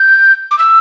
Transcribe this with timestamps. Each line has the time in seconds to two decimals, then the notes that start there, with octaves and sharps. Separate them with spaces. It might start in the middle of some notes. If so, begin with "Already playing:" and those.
Already playing: G6
0.51 D6
0.59 E6